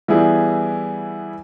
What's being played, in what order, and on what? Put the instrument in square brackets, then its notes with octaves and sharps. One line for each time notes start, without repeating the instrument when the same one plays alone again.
[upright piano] E3 G3 B3 E4 G#4